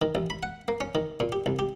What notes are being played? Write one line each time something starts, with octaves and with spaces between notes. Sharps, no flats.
D#3
A1
B5
F#5
A#3
C#4
D#3
A#2
G4
C2
G4